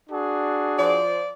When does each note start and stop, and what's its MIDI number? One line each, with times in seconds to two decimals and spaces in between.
0.10 0.99 62
0.10 0.99 66
0.10 0.99 68
0.79 1.33 53
0.79 1.33 74